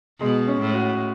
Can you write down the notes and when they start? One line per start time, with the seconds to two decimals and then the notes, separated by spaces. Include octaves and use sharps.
0.20 B2 G#3
0.47 C#4
0.61 A2
0.74 F#4